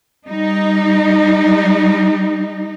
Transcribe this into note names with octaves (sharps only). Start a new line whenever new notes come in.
G3 D#4